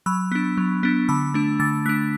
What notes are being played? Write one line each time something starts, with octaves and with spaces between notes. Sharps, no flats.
F#3 B5 E6
B3 D4
F#3
B3 D4
D3 B5 E6
A3 D4
D3 E6 A6
A3 D4 F#6 B6